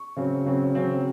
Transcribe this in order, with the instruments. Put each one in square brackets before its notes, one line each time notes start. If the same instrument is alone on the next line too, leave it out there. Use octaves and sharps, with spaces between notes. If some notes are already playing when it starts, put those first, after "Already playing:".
Already playing: [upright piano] C#6
C#3 F#3 C4
C#3 F#3 C4
C#3 F#3 C4